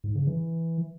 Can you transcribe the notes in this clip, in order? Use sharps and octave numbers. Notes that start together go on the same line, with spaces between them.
G#2
C#3
E3